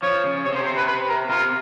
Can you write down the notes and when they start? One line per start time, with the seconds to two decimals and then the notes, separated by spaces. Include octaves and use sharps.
0.02 F3 C#5
0.24 C#3
0.45 C3 C#5
0.52 C#3
0.55 C5
0.59 C3
0.66 C5
0.77 B4
0.87 B4
1.09 A#4
1.29 C3 F4